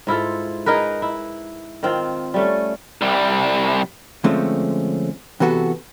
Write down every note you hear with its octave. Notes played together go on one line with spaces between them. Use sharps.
G#2 E4 F4 A4
D#4 G#4 A#4 B4
E4
D#3 C4 F4
G3 A3 C#4
C2 G3
D3 F3 G#3 A3 C4 C#4
C3 E3 B3 F#4 A4